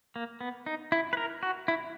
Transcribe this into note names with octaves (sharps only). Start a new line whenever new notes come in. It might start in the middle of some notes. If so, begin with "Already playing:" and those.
A#3
B3
D#4
E4
B4
A#4
F#4
E4